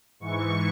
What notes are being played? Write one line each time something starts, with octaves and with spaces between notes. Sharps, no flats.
G#2 E3 C#6